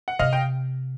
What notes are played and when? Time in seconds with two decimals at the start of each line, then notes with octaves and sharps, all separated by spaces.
0.08 F#5
0.19 C3 D#5 F5
0.33 G5